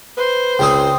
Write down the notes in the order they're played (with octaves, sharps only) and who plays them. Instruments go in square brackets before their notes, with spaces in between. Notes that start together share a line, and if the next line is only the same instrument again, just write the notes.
[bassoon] B4 [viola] C5
[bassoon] C#2 [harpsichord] C#3 C4 G#4 [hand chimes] G5 D#6